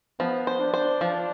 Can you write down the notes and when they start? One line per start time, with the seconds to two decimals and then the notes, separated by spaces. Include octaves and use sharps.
0.20 F3 B3
0.47 C5
0.60 D4
0.74 C5
1.01 F3